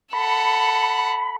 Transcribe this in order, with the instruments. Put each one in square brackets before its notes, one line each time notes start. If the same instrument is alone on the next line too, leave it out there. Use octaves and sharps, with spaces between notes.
[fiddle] A4 F#5 [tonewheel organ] B5